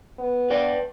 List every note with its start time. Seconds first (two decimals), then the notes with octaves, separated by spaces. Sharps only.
0.19 B3
0.50 B4 D5 G5